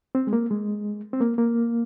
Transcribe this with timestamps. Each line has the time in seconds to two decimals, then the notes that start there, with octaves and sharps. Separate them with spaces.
0.15 C4
0.27 G#3
0.33 A#3
0.51 G#3
1.13 C4
1.21 A#3
1.38 A#3